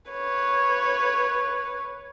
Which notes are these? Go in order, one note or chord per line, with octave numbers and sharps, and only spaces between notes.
B4 C#5